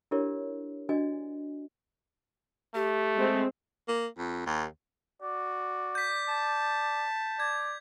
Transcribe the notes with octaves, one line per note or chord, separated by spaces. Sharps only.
D4 E4 G4 A#4 C#5 D5
D4 F#4 D5 D#5 G#5
A3 G4
G#3 C4
A#3
F2
D#2
F#4 D5
G6 B6
A5
D5 G#6